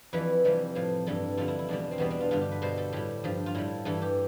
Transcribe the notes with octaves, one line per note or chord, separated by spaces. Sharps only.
F2 E3 G3 B4
F2 C3 E3 G3
A2 F3
G2 E3 G3 A4
F2 D3 G3 F4
E4
E4
E2 B2 G3 D4
C4
E2 B2 G3 B3
D4
F4
G2 D3 G3 F4
G4
B4
B2 G3 C5
A4
A2 G3 G4
G2 F3
F4
A2 G3 E4
G2 E3 G3 A4
G4